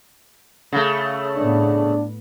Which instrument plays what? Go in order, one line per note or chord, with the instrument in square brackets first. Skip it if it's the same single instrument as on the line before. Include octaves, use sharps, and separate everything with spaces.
[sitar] C#3 A3
[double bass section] A2 B3 [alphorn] D4